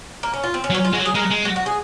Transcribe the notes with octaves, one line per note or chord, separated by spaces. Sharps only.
A#3
C#4
F4
C4
C#4
F#3
C#4
F4
G#3 F#4
F#3
G#4
G#3 A#4
G#3
F#4
F#4
G#4